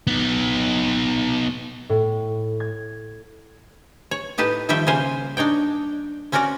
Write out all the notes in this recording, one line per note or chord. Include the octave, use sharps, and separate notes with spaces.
B3 D#4
A2
G#6
C#5
A2 D#4 G4 B4 A5
D#3 F3 G3 G4 E5 G5
C#3 G3 A#3 C5 G#5
D4 D#4 C#5 G5
C4 C#4 F#4 A#4 D5 F#5